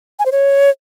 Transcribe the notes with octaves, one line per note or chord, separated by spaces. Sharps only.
G#5
C5
C#5